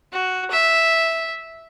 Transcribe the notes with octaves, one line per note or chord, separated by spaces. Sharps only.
F#4
E5